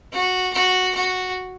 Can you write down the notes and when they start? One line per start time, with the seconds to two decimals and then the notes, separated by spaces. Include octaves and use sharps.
0.12 F#4
0.53 F#4
0.94 F#4